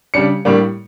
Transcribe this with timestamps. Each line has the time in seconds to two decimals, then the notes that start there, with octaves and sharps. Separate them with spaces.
0.14 C#3 G3 D4 C#7
0.45 A2 G3 A#3 D4